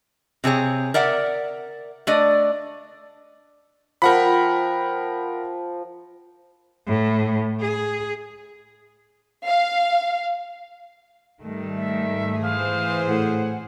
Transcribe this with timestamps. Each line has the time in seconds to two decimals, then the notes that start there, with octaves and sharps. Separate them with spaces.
0.44 C3 C4 G#4 C#5
0.94 A#4 D5 E5 F#5
2.07 A3 D4 D5 D#5
4.02 F3 A#4 F#5 G5 B5
6.87 A2
7.60 G#4
9.46 F5
11.42 G#2 D#3 G3 A3
11.77 E5
12.43 E3 G#4 C5 F5
13.08 A2 F#5